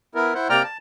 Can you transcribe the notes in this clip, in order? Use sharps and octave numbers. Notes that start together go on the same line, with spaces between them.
B3 E4 A#4
E4 C5 F#5
C3 A#3 D5 G5 A#5 F6
A5